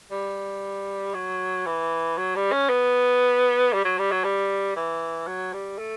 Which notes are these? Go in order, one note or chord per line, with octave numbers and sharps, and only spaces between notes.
G3
F#3
E3
F#3
G3
C#4
B3
G3
F#3
G3
F#3
G3
E3
F#3
G3
A3